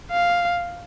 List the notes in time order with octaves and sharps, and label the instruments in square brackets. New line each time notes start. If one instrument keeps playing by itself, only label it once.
[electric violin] F5